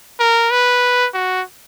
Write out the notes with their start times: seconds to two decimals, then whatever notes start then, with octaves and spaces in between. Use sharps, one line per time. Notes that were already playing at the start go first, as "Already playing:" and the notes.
0.20 A#4
0.51 B4
1.14 F#4